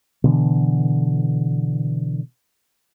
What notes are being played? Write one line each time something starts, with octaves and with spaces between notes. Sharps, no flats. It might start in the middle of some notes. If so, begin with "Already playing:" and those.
B2 D3 E3